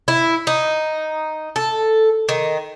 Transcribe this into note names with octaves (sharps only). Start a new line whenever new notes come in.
E4
D#4
A4
D#3